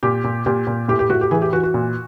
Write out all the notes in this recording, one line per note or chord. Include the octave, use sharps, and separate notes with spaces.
A#2 G4
A#2
A#2 G4
A#2
A2 G4
G4
A2 F#4
G4
E3 G#4
G4
E3 F#4
F#4
A#2